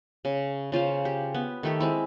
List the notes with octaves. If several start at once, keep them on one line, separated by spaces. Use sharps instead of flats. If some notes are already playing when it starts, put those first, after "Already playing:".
C#3
C#3 F4 C5 F5
G4
B3
D#3 A3 G4
G#3 C4 E4